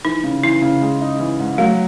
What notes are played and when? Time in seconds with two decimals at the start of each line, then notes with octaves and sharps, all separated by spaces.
0.04 E3 D#4
0.24 C#3
0.43 E3 E4
0.62 C#3
0.81 G#3
1.01 D#4
1.19 E3
1.40 G#2
1.58 F#3 A3